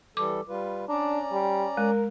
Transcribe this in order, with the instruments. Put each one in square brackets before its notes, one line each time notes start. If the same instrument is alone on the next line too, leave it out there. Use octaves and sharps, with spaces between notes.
[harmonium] E3 G3 A4 [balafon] D6
[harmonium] G3 F4 B4
[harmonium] C#4 D5 A#5 [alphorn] D4
[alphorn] G3
[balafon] G#3 [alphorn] A#4